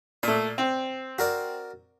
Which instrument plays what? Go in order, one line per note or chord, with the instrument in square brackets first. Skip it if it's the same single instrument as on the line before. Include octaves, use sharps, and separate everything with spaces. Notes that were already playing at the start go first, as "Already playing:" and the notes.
[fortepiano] A#2 A3 [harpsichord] D5
[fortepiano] C4
[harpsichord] F#4 A#4 D5